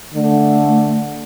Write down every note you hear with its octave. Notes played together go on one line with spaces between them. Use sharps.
D3 A3